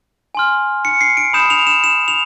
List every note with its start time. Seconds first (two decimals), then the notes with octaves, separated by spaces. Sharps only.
0.35 G#5 C6 F6
0.85 C#7
1.01 C7
1.17 D7
1.33 B5 D#6 G6 E7
1.50 F7
1.67 E7
1.84 E7
2.08 F7